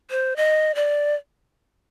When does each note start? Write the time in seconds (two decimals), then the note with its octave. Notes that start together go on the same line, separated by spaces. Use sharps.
0.11 C5
0.36 D#5
0.75 D5